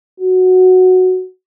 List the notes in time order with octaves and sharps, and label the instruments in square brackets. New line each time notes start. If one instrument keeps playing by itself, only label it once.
[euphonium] F#4